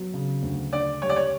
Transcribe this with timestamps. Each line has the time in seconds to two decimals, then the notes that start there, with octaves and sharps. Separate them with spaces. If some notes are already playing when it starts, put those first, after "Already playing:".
Already playing: F#3 B3
0.14 C#3
0.43 D2
0.73 D4 D5
1.02 G3 C#5
1.09 D5
1.16 C#5